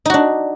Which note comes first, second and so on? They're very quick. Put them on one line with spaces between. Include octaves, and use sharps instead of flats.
D#4 F#4 D4